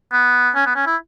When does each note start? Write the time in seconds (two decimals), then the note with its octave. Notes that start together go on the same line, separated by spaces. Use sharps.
0.13 B3
0.55 C#4
0.66 B3
0.76 C#4
0.87 E4